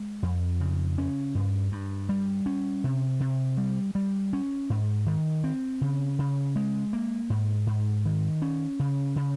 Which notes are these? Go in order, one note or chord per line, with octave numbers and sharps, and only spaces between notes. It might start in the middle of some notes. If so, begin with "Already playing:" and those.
Already playing: G#3
F2
C#3
C#4
G2
G2
G3
C#4
C3
C3
G3
G3
C#4
G#2
D#3
C4
C#3
C#3
G#3
A#3
G#2
G#2
D#3
C#4
C#3
C#3